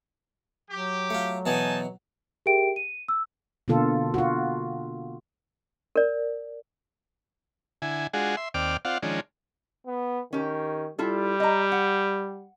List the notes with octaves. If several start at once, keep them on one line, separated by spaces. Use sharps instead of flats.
F#3 G4
A3 F4
B2 E3 B3 D#4 G#5 A5
G4 G#4 A#4 E5 G5 D7
D#7
E6
B2 D3 A#3 F4 A4
F4 F#4
A#4 D5
D3 E4 G#5
G#3 D4 F4 F#4 G#4
E5 C6
D#2 C4 D5 G5 D6 F6
C4 F4 D5 F5 F#5
D#3 F3 G#3 C#4 D4
B3
D#3 C#4 G4
G3 E4 F4 A4
D#5 A#5
F#5